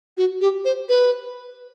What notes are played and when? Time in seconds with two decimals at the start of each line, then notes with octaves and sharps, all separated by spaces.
0.17 F#4
0.41 G4
0.65 C5
0.89 B4